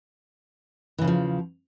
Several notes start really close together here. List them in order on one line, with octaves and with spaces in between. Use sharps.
E3 C#3 E2 F3